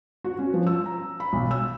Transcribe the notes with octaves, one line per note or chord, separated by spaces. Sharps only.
F#4
C#4
F3
E6
A#5
B5
B1
E6